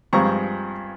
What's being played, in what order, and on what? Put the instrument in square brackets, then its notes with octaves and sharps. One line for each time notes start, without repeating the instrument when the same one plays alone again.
[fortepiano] G2 F3 G#3 C4 A#5 C#6